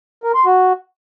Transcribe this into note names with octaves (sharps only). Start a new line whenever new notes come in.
A#4
C6
F#4